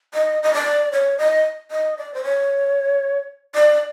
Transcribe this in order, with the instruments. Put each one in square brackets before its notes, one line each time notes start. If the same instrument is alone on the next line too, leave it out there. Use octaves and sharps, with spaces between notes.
[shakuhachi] D#5
D#5
D5
C#5
D#5
D#5
D5
C5
C#5
D5